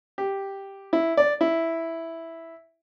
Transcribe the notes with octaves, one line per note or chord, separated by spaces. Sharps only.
G4
E4
D5
E4